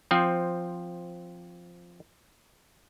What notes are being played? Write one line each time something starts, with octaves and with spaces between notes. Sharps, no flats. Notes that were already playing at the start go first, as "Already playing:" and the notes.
F3 C4